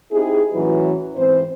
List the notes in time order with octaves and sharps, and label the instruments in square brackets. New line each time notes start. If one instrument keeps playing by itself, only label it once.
[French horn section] C4 D#4 E4 G4 G#4
A2 E3 F#3 C#4 E4 B4
G#2 E3 C4 C5